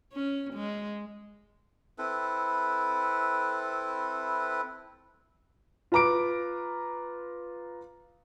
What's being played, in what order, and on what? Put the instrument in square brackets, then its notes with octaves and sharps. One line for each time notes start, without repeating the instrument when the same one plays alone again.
[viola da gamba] C#4
G#3
[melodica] C4 E4 A4 B4
[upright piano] F4 B4 A#5 D6 D7